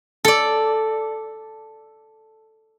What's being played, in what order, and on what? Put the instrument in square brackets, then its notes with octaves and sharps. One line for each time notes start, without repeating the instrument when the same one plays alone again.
[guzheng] A4 D5